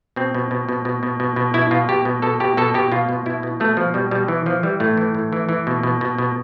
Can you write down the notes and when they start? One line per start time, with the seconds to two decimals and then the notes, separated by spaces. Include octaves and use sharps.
0.16 B2 C4
0.34 B2
0.51 B2
0.69 B2
0.85 B2
1.03 B2
1.20 B2
1.36 B2
1.54 B2 E4
1.71 B2 F4
1.89 B2 G4
2.05 B2
2.22 B2 A4
2.40 B2 G4
2.57 B2 A4
2.74 B2 G4
2.92 B2 F4
3.09 B2
3.26 B2 E4
3.43 B2
3.60 B2 A3
3.77 B2 F3
3.94 B2 G3
4.11 B2 G3
4.28 E3
4.46 E3 F3
4.63 E3 G3
4.80 A2 A3
4.97 E3
5.15 A2
5.33 E3
5.49 E3
5.67 B2
5.83 B2
6.01 B2
6.18 B2